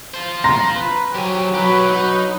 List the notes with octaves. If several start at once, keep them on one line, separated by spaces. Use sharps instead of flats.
F4 C5
A#5 C6 A#6
B4
F3 F#3 G4 G#5
B2 F#3 G4 B4
F#3 D#4